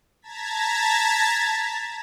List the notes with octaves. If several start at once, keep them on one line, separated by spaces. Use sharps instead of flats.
A5 A#5 G#6 A6 B6